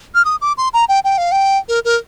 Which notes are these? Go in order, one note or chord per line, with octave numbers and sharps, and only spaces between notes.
F6
D#6
D6
C6
A#5
G5
G5
F5
G5
A#4
A#4